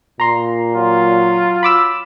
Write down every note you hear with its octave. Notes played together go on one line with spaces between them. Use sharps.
A#2 A#5 C6
F#3 F4
B5 D6 E6